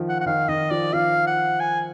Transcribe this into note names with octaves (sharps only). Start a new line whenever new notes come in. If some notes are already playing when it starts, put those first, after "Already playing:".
Already playing: D#3 F3
F#5
F#5
D#3 F5
D#3 D#5
F3 D5
F3 F5
F#5
G#5